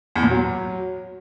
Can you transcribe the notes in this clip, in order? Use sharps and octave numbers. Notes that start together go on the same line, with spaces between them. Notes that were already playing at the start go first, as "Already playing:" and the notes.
E2
A#2
F#3